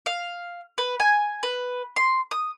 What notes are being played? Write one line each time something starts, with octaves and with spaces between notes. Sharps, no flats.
F5
B4
G#5
B4
C6
D#6